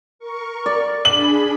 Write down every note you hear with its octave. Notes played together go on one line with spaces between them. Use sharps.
A#4 C#6
D5
D4 G#4 B5 F#7